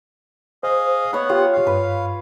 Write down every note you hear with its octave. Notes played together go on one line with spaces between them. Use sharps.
G#4 C5 D#5 F5
B3 C#5 F#5 B5
F4 G4 G5 C6
F5
G2 B4